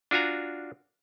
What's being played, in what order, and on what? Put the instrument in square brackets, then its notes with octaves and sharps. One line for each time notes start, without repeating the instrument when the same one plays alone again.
[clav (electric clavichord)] D4 F4 F#4 G#5 A#5